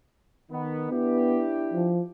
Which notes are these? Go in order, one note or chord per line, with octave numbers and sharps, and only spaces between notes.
D#3 B3
B3 D4 E4 G4
F3